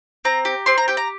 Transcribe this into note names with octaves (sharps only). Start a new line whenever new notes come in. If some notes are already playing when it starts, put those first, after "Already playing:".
C4 A#5
G4
C4 C6
A#5
G4 G5
A#5